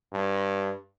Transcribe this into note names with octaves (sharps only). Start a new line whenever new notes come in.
G2